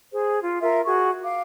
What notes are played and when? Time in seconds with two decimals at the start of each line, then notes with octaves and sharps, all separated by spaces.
0.11 G#4 C5
0.41 F4
0.61 F4 A#4 E5
0.85 F#4 G#4 C#6
1.24 F5 D6